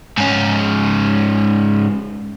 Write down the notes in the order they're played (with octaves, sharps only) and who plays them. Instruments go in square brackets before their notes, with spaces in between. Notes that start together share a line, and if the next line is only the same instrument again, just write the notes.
[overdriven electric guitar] G#2 C#4